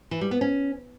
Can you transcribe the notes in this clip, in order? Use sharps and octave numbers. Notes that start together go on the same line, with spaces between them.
E3
G3
B3
C#4